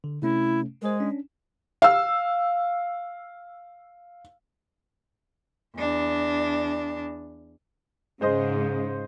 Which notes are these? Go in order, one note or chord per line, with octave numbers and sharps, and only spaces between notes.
D3
C3 A3 C#4 E4
G#3 A#4 C5
C#4 D4
F5 E6
E2 D4
G#2 C#3 G#3 C5 D#5